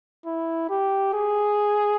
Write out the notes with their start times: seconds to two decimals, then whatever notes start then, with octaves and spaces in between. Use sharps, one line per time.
0.26 E4
0.70 G4
1.14 G#4